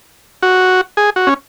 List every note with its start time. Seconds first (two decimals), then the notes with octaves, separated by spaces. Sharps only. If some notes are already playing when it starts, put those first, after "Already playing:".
0.43 F#4
0.97 G#4
1.16 F#4
1.27 C#4